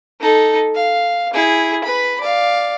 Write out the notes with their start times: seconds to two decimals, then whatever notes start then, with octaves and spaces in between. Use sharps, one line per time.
0.21 D#4 A4
0.75 F5
1.33 E4 G#4
1.84 B4 B5
2.21 D5 F5